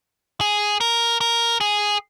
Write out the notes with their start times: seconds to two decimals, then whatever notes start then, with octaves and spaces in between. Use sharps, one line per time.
0.41 G#4
0.81 A#4
1.21 A#4
1.61 G#4